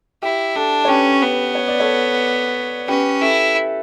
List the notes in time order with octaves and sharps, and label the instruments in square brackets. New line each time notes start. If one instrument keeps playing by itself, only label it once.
[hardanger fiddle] E4 [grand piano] G4
[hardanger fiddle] D4 [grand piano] A4
[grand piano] C#5
[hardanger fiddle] C#4 [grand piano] G4 B4
[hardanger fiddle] B3
[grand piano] C#5
D5
A4 C#5
[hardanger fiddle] C#4 [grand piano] G4 B4
[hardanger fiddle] E4 [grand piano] A4